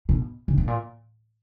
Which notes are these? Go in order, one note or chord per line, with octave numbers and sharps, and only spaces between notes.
B2
C#3
B2
A#2